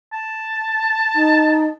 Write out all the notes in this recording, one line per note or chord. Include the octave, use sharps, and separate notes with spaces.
A5
D#4